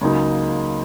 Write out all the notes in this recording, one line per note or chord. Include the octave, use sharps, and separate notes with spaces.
C#2 C#3 F#3 A#3 D#4